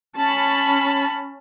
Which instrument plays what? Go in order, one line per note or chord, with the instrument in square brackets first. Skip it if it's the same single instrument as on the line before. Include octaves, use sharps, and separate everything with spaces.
[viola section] C#4 A5 B5